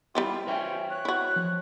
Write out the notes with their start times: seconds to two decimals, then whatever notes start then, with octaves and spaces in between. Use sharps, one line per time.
0.15 G3 E4 F4 G4
0.47 C#4 B4 C5 E5 G5
0.90 C#5 F#6
1.05 E4 F#4
1.36 F3